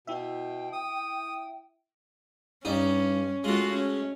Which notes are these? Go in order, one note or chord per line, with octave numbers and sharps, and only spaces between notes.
B2 E4 E5 G5
D#6
G2 C#4 D#4
G#3 A3 F4 F#4
C#4